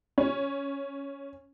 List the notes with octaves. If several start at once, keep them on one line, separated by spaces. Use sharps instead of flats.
C#4